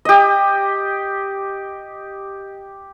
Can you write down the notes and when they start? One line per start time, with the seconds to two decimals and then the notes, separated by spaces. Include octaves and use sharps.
0.05 G4 D#5